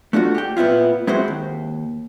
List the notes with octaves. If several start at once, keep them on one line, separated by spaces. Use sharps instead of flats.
A3 D4 F4 F#4
G4 G5
A#2 B3 C4 E4 F4
G#3 C4 E4 F#4 C5
D#2